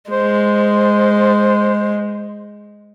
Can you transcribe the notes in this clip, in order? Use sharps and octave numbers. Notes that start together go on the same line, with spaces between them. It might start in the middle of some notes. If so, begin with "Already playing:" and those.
G#3 C5